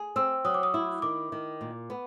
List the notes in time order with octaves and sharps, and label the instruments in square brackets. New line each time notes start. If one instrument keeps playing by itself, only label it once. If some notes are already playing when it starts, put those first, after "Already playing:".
Already playing: [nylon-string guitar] G#4
[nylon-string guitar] C4 [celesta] E6
[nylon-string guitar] F#3 [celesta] D#6
[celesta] D6
D#6
[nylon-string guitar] E4
[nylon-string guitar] D#3 [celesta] D6
[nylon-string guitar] D#3
A#2
B3